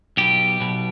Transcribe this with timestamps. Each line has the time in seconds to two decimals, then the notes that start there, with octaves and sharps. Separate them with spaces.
0.17 B1 B2 G4
0.60 B1 B2